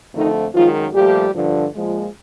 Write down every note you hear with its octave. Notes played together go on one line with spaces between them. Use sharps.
F2 D3 D#3 F3 A3 D#4
F#2 D#3 F3 G#3 F4
A#2 F3 G3 A3 G4
G2 D3 F3
A#2 F3 G#3